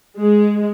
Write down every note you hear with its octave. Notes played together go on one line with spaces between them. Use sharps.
G#3